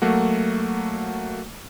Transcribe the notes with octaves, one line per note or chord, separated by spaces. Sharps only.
F#3 A3 A#3 F#4